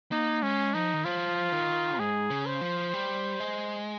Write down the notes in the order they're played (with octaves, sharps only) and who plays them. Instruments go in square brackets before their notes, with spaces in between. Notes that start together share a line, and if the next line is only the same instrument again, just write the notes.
[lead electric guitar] A#3 [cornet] D#4
[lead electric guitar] G#3 [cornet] C#4
[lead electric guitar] F3 [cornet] D#4
[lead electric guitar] D#3
[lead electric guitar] F3 [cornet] F4
[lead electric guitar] D#3
[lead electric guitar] G#2 [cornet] G#4
[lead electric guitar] C#3
[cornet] C5
[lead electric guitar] F3
G3
G#3